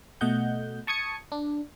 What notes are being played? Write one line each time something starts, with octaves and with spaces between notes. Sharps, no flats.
B2 A3 D#5 F#5 G6
A5 C#6 D#6 G#6 C#7
D4